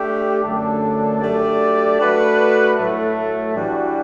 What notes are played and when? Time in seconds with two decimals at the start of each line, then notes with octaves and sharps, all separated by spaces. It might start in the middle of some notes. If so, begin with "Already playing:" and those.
Already playing: A3 D4 G4
0.43 F#2 D3 A3 D4 A4
1.20 F#3 A3 D4 G4 D5
1.99 A3 D4 F#4 B4
2.76 A2 F#3 A3
3.55 E3 G3 D4 F#4